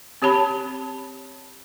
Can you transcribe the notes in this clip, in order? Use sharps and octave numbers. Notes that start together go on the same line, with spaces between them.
C4 G4 C#5 A5 B5